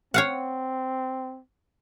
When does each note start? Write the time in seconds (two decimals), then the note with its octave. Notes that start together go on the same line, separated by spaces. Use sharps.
0.14 C4 C#5 F5 F#5